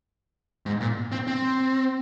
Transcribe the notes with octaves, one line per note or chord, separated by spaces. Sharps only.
G#2
A#2
C4
C4